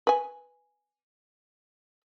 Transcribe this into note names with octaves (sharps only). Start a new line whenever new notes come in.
B4 G#5